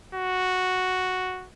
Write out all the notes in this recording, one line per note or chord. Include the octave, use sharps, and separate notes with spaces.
F#4